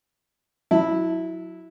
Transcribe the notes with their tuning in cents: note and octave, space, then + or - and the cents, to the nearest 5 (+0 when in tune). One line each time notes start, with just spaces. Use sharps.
F#3 -25 E4 -10 A5 +15